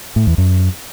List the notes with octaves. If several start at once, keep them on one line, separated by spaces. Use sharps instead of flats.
A2
E2
F#2